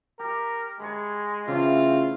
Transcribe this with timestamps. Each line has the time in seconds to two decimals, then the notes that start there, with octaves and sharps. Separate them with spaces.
0.19 G4 A#4
0.79 G#3 C#5 A#5 B5
1.48 C#3 E3 A3 C4 F4